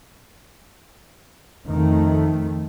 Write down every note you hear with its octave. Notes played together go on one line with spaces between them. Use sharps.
F2 D#3 A3